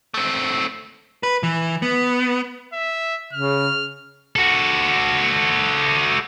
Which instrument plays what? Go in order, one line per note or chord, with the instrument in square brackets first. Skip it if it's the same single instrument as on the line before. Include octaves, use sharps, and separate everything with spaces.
[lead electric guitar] A3 C4
B4
E3
B3
[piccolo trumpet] E5
[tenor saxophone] C#3 [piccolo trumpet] F6
[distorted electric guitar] F#4 A4